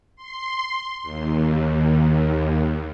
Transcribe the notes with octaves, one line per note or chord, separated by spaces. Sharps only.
C6
D#2